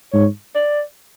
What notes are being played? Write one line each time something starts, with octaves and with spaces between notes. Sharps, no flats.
G#2 C#5
D5